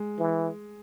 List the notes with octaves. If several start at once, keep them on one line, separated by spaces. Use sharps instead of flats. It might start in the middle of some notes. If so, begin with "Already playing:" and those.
Already playing: G#3
E3